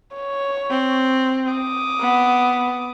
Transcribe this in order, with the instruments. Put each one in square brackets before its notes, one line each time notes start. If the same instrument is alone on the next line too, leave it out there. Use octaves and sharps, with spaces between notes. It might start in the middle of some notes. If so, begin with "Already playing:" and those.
[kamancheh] C#5
[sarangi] C4
[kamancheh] D6 D#6
[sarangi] B3